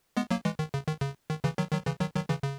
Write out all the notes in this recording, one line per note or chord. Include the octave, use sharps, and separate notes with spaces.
G#3 B3
F#3 A#3
E3 G#3
D#3
C#3
D#3
C#3
D#3
C#3 E3
D#3 F#3
D#3 F#3
C#3 E3
D#3 F#3
D#3 F#3
C#3 E3
C#3